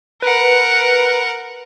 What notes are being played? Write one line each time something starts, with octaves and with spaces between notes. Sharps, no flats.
A#4 B4 F#5